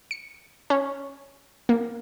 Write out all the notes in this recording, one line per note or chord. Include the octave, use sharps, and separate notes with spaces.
C#7
C#4
A#3